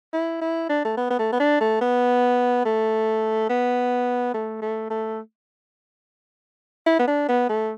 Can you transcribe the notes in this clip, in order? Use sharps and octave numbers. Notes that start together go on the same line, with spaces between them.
E4
E4
D4
A3
B3
B3
A3
B3
D4
A3
B3
A3
B3
A3
A3
A3
E4
B3
D4
B3
A3